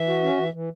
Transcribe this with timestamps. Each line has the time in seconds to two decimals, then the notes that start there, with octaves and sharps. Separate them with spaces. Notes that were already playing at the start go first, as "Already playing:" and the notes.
Already playing: E3 E5
0.08 F#4
0.23 C#4
0.38 E3
0.54 E3